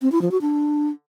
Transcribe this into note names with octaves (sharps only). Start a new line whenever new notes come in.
C4
E4
F3
F#4
D4